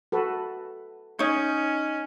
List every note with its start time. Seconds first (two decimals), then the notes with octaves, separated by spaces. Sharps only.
0.12 F#4 A4 B4
1.19 C#4 D#4 C#5